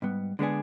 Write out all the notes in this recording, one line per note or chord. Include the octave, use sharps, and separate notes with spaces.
G#2 G3 B3
D3 G#3 B3 D4 G#4